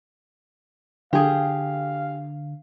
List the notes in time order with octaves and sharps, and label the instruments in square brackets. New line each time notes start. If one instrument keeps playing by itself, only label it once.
[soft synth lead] D3 [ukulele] G4 G#4 [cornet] F5